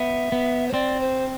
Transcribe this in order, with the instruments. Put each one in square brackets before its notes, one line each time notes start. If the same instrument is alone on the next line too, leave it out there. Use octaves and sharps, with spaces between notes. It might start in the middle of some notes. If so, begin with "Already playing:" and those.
Already playing: [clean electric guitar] B3 [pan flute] E5
[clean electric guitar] B3
[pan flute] C5
[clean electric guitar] C4 [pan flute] D5
[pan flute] C5